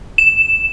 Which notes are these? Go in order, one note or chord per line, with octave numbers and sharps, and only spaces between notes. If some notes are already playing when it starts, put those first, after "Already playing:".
E7